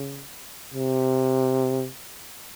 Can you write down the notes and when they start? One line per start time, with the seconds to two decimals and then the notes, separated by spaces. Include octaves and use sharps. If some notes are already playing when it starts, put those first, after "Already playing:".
Already playing: C#3
0.74 C3